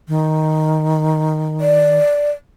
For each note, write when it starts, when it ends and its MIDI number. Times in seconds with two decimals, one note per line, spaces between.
0.08 1.99 51
1.60 2.30 74